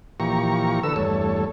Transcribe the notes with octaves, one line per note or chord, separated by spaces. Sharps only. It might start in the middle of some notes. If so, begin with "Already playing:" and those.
A#2 E3 F3 G4 A#5 C#6
D3 A4 B4 E6
E2 G2 A3 A4 C#5